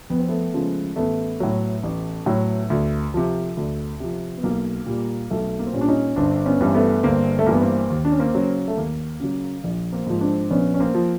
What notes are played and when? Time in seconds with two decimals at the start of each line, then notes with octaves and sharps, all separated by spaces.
0.10 F2 B3
0.19 C4
0.28 A3 B3
0.54 C#3 F3 G#3
0.96 A1 A3 B3
1.40 A2 F#3
1.83 A1
2.26 A2 F#3
2.70 D2
3.14 C3 F3
3.57 D2
4.00 C3 F3
4.37 B3
4.43 B1 A#3
4.86 A#2 G3
5.30 B1 A3
5.59 A#3
5.67 C4
5.73 A#2 G3 C#4
5.81 D4
5.89 C#4 D#4
6.16 G1 C4 D4
6.46 B3 C#4
6.61 G2 E3
6.70 C4
6.74 A3 B3
7.03 G1 A#3 C4
7.39 A3
7.46 G2 E3 A#3
7.54 B3
7.61 A#3 C4
7.90 D#2
8.05 D4
8.12 C#4
8.19 A#3 C4
8.34 C#3 F#3
8.68 A3
8.77 D#2 A#3
9.20 C#3 F#3
9.64 A#1
9.92 A#3 C4
10.07 G#2 F3
10.21 C4 D4
10.50 A#1 B3 C#4
10.74 C#4
10.80 A#3 C4
10.95 F3